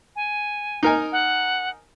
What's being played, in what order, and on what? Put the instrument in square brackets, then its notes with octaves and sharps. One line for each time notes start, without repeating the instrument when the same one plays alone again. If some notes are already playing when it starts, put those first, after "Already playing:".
[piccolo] G#5
[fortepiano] D#4 A#4 G#5
[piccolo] F#5